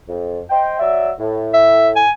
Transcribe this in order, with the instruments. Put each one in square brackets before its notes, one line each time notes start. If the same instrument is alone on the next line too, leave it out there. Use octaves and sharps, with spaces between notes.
[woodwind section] F2
C5 D#5 G5
F#3 D5 E5
A2
[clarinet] E5
G#5